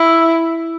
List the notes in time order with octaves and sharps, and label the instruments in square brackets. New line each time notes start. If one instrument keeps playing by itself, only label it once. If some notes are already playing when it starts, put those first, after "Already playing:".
Already playing: [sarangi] E4